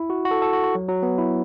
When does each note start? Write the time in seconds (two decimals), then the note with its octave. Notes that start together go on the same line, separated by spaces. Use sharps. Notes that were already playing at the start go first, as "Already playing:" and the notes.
Already playing: E4
0.10 F#4
0.25 F#4
0.31 A4
0.42 A4
0.53 F#4
0.64 F#4
0.75 F#3
0.88 F#3
1.03 B3
1.18 E4